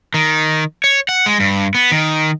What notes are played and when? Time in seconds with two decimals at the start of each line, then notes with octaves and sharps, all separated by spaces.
0.14 D#3
0.84 C#5
1.09 F#5
1.26 G#3
1.40 G2
1.75 B3
1.92 D#3